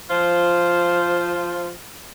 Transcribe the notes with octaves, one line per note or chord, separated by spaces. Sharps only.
F3 F4 C5